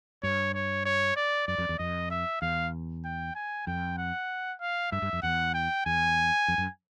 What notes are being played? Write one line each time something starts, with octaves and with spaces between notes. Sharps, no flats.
G2 C#5
C#5
C#5
D5
F#2 D5
F2
E2
F2 D#5
E5
E2 F5
G5
G#5
F2 G5
F#5
F5
G2 E5
G2
F2
E2 F#5
G5
E2 G#5
F2
F#2